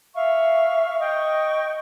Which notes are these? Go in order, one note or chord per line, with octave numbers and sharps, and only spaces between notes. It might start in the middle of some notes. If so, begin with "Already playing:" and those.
E5 F5 C#6
D#5 G5 C#6